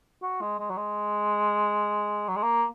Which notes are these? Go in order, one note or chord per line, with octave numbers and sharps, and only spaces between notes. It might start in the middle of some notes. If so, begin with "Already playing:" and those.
F#4
G#3
G#3
F#3
G#3
F#3
G#3
A#3